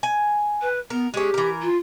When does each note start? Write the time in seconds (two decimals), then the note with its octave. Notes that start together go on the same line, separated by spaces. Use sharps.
0.03 G#5
0.61 B4
0.90 B3 A#4
1.14 G#3 C#4 G4
1.34 E3 A#4
1.62 F4